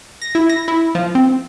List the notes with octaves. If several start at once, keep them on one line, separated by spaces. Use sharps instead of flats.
A#6
E4
A#6
E4
F3
C4